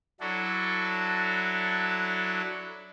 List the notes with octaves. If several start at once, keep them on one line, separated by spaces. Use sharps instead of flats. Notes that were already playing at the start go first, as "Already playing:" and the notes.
F#3 D4 E4 F#4 A4